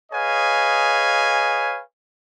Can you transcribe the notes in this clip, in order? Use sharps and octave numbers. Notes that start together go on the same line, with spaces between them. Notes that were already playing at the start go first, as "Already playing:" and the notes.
G#4 B4 C#5 D#5 F5 G#5